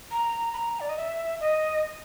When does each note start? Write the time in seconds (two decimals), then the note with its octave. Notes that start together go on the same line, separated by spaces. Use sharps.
0.11 A#5
0.53 B5
0.57 A#5
0.80 D5
0.89 D#5
0.97 E5
1.41 D#5